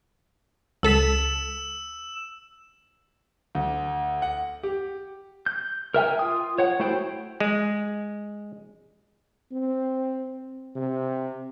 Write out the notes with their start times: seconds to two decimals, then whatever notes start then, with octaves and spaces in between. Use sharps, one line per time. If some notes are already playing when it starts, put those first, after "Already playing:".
0.83 C#2 A4 E6 B6 E7
3.55 D2
4.22 F#5
4.63 G4
5.46 G6
5.94 A#4 E5 G5 G#5
6.19 F4 D#6
6.58 C#5 F#5
6.80 A3 E4 F#4 C5 G5
7.40 G#3
9.52 C4
10.75 C3